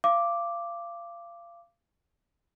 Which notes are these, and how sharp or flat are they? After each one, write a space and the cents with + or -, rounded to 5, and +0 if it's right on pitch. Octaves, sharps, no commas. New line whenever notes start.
F5 -30 D6 +0